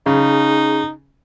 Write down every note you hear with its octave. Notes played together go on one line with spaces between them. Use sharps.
C#3 D#4 G#4